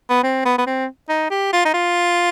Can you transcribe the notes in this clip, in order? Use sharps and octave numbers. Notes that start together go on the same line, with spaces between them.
B3
C4
B3
B3
C4
D#4
G4
F4
D#4
F4